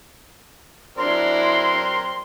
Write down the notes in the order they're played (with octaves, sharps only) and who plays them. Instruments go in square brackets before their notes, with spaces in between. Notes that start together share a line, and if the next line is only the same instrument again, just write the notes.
[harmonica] F#3 C4 A#4 [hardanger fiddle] D4 E4 [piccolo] C6